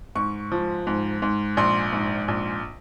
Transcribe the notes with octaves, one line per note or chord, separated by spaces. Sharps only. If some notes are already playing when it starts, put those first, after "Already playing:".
G#2 C#6
F3
G#2
G#2
A#1 C6
G#2
A#1